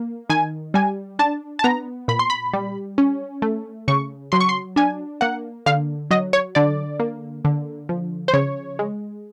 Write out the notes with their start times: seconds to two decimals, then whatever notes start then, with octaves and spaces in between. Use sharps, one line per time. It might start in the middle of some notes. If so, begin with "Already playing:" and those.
Already playing: A#3
0.29 D#3 G#5
0.74 G3 G#5
1.19 D4 A5
1.59 A5
1.64 B3 A#5
2.08 A#2 B5
2.19 C6
2.30 B5
2.54 G3
2.98 C#4
3.42 A3
3.88 C#3 C#6
4.32 F#3 C6
4.40 C#6
4.49 C6
4.76 D4 G#5
5.21 A#3 F#5
5.66 D3 F5
6.11 F#3 D#5
6.33 C#5
6.55 D3 D5
7.00 A#3
7.45 D3
7.89 F3
8.28 C5
8.34 C#3 C#5
8.79 G#3